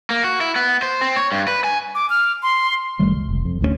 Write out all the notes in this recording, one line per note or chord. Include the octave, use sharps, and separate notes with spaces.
A#3
F#4
E4
B3
C5
C4
C#5
G2
B4
G#5
D6
F6
C6
F#1 D#3 G3 A3
C#2
F1
F2
D1 D2 G#3 C#4